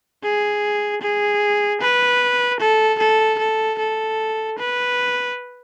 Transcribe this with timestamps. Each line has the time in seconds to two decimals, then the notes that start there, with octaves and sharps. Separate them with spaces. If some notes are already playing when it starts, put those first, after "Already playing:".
0.24 G#4
1.02 G#4
1.81 B4
2.60 A4
2.99 A4
3.39 A4
3.79 A4
4.58 B4